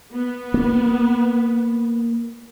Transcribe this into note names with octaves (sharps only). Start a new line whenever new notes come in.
B3
A#3